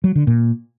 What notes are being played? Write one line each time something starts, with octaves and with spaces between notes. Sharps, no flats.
F#3
D3
A#2